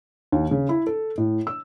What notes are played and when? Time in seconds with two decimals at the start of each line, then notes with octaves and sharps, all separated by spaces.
0.32 D#2
0.51 C#3
0.69 E4
0.87 A4
1.18 A2
1.47 E6